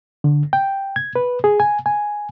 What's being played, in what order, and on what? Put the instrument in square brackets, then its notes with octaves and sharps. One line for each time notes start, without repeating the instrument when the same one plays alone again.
[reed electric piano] D3
G5
G#6
B4
G#4
G#5
G#5